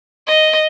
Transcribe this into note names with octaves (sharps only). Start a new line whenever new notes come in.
D#5